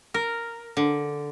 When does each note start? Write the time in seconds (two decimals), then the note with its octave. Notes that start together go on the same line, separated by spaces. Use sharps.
0.14 A#4
0.77 D3